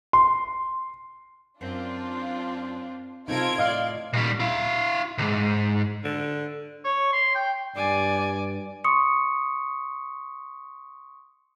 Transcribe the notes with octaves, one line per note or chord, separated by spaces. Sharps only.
C6
F#2 C4 D4 F4
C3 C4 D#4 F4 A4 A#4 G#6 D7
A2 D5 D#5 F5 C6 F6
A#2 G3
E4 F5
B1 G#2
D3
C#5
C6
G5
G2 D5 G#5 D6
C6 C#6 D#6 C#7